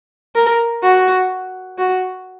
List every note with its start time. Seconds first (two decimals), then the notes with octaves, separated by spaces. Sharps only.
0.36 A#4
0.83 F#4
1.78 F#4